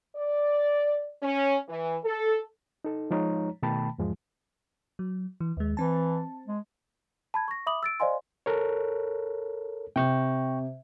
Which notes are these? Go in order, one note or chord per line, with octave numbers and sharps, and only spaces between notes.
D5
C#4
E3
A4
D#4 A4
F3 G#3 D#4 C#5 A#5
B2 D#3 A3 G5 A5 B5
E2 G#2 F3 G#3
F#3
E3
D#2 G#3
E3 C4 A5
G#3
A5 B5 G#6
C#6 A#6
E5 B5 D6 D#6 F#7
E6 A6 D7
C5 D5 D#5 F5 G#5 C6
A4 A#4 C#5
C3 G5 C#6 G6